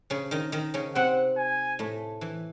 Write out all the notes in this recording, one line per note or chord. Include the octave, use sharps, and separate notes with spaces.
C#3 C#4
D#3 D#4
D#3 D#4
C#3 C#4
C3 C4 F#5
G#5
A2 A3
E3